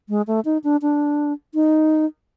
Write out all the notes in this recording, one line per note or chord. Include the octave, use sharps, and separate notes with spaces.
G#3
A3
D#4
D4
D4
D#4